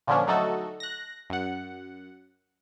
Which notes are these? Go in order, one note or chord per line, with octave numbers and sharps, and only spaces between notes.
A#2 D3 F3 C#4 D4
F#3 A3 D#4 F#4 A4
F#6 A#6
F#2 F#5